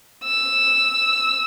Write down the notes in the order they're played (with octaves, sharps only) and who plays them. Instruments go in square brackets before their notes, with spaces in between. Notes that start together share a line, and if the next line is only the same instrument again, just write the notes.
[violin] E6